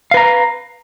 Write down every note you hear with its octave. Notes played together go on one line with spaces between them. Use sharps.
B4 F5 A#5